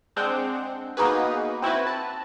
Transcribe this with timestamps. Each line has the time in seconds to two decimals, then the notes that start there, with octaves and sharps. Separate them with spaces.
0.16 G#3 C4 D4 F#5 G6
0.97 A#3 B3 D#4 F#4 G#4 B4
1.62 C4 E4 F#4 B4
1.87 A5